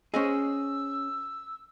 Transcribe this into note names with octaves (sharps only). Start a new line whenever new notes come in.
C#4 G#4 C5 D#5 E6